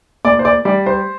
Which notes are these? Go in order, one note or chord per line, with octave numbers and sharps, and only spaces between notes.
A#2 D5
C5
D5
G3 D5
C5